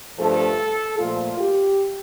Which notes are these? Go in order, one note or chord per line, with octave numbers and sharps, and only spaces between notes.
G2 F3 A3 A4
A#2 F3 A3 F4
G4